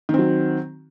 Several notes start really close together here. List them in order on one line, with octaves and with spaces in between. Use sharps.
D#3 C4 F#3